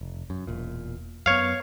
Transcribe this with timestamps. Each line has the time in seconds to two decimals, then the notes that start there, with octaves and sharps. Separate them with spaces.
0.01 F1
0.30 F#2
0.47 E1 A#2
1.26 F#2 B3 C#5 F5